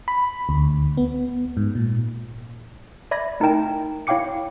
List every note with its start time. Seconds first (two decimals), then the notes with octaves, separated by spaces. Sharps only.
0.08 B5
0.49 D2
0.97 B3
1.57 G#2
1.75 A#2
3.11 D5 E5 B5 G#6 A#6
3.40 A3 D#4 E4 A#4 G5 A5
4.07 E4 C#5 F5 G5 D6 C#7